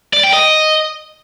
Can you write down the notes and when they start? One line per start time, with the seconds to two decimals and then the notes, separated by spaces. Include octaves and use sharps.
0.13 D5
0.23 G5
0.33 D#5